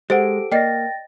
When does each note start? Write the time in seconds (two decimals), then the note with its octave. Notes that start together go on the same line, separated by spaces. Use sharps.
0.10 G#3 G4 A4 C5 F#5 D7
0.52 A#3 D5 D#5 G5 A6 A#6